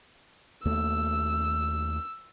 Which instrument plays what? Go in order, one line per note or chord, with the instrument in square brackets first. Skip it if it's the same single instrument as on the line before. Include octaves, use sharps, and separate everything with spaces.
[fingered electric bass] D#2 A3 [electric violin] E6